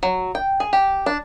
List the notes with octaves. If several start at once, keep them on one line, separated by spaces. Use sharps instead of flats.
F#3
G5
G#4
G4
D4